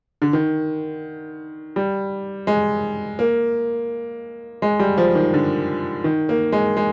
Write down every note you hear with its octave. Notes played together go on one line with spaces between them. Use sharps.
D3
D#3
G3
G#3
A#3
G#3
G3
F3
D#3
D3
D#3
A#3
G#3
G#3